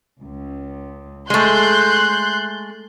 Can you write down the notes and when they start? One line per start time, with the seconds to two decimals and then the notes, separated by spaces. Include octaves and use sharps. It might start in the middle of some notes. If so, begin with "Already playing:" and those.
0.22 C#2
1.30 G#3 A3 C6 F#6 G6